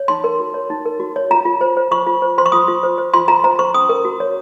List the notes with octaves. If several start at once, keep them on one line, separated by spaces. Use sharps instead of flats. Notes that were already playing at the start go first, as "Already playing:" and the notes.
Already playing: C#5
D#4 C6
A#4
F#4
C#5
D#4
A#4
F#4
C#5
F4 A#5
F4
C5
C5
F4 C#6
F4
C5
C5 C6
C#6
F4 D#6
F4
C5
C5
F4 C6
F4 A#5
C5 A#5
C5 C#6
C#4 D#6
A#4
F#4
C#5